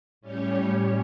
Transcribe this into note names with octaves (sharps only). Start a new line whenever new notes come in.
A2 G3 C#4 G4 C#5